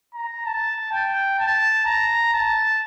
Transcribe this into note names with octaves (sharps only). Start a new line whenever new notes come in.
A#5
A5
G5
A5
A#5
A5